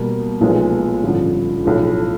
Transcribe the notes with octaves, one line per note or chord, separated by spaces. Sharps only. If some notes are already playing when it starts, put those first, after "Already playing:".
Already playing: B2 G3 A#3
B1 A#2 F3 G#3 B3
A1 G2 D3 F3
B1 A2 F3